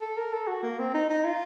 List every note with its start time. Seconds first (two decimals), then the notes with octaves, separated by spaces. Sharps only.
0.01 A4
0.17 A#4
0.33 A4
0.47 F#4
0.63 A#3
0.79 C4
0.94 D#4
1.10 D#4
1.24 F4